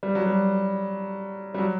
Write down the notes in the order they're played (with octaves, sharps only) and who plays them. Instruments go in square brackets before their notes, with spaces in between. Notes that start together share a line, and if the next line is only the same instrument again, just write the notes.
[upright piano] G3
F#3
G3
G3
F#3